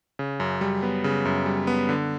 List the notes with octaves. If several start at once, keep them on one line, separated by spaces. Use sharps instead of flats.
C#3
F#2
G3
B3
C#3
F#2
G3
B3
D3